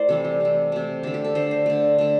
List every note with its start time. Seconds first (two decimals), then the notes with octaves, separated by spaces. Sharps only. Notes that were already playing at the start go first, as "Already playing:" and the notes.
Already playing: A3 E4 C5 D5
0.09 C3 E3 G3 A4
0.24 G4
0.40 C3 A3
0.72 C3 A3
1.03 D3 A3 A4
1.14 G4
1.25 A4
1.35 D3 A3 C5
1.51 C5
1.66 D3 A3
1.98 D3 A3